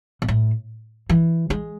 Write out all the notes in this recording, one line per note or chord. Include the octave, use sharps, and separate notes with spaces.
B2
A2
E3
G#3